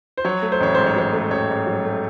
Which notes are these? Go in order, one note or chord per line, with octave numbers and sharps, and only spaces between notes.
C5
F#3 C#5
A3
C5
A1 C#5
G#2 C5
C#5
F#3 C5
A3
A1 C#5
G#2
F#3
A3